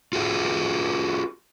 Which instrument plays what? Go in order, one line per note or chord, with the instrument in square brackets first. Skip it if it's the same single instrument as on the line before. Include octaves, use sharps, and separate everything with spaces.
[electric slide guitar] F4 F#4 G#4